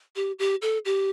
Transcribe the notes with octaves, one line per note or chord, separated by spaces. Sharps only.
G4
G4
A4
G4